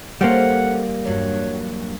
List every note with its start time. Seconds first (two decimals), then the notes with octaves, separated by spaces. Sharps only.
0.21 G3 A#3 C#4 A4 C5 F#5
1.05 E2 G2 F#3 C#5